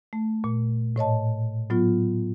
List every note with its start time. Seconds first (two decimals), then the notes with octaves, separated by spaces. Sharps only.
0.13 A3
0.44 A#2
0.96 A2 C#5 D#5 A5
1.70 A2 F#3 B3 F4